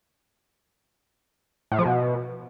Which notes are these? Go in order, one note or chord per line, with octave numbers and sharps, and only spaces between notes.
A2
F3
B2